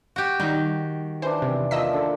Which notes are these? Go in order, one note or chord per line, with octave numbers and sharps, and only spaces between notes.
F#4 G4
D#3 G3 D#4
E3 D4 C5
E2 C3
F3 A#3 D#5 E6 B6
D3 A4